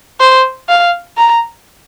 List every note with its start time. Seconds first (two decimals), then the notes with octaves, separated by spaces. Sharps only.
0.20 C5
0.69 F5
1.17 A#5